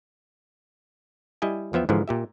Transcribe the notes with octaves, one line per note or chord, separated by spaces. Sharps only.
G3 E4 D#5 G#5
E2 F3 B3 E5 G5
G#2 D3 E3 F3
A#2 G4 E5